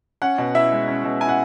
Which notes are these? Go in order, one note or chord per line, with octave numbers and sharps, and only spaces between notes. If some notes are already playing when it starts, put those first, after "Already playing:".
C#4 F#5
B2
E4 E5
G#3
C#4
B2
E4 G#5
F#5